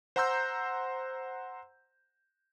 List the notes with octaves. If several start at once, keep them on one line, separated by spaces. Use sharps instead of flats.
C5 F#5 A#5 C6 E6 G6